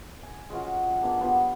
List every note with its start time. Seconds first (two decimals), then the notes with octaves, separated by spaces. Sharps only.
0.23 G#5
0.50 G#3 C#4 F4 F#4
1.01 A#3 B3 D4 G#4
1.21 B3 F4 G4